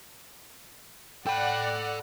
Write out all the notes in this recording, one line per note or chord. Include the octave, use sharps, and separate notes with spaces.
A4 D5 F#5 G5 B5